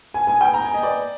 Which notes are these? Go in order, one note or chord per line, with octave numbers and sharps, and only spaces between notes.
G#5
G#5
G5
A#5
G#5
D#5
D5